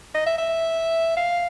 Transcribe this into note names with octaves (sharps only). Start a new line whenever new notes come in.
D#5
E5
E5
F5